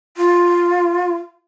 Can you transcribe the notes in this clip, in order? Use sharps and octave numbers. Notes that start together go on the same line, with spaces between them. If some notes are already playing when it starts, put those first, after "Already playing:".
F4